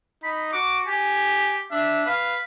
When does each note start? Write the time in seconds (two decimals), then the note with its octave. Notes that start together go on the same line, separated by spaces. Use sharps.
0.23 D#4 B5
0.53 F#4 D6
0.87 G4 G#5
1.71 D4 E5
2.06 B4 F5